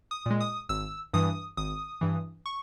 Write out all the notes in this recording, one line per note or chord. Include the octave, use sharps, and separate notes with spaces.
D#6
A#2 G#3
D#6
G#1 E6
G2 E3 D#6
G#1 D#6
G2 E3
C#6